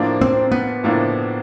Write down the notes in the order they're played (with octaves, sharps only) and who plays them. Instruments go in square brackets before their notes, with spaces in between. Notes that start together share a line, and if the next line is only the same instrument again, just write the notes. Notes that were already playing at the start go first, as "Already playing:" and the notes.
Already playing: [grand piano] A2 F3 A#3 D4
[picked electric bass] C4
B3
[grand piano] A2 F3 A#3 D4